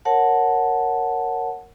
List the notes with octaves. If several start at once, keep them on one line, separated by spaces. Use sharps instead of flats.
A#4 C#5 F#5 A5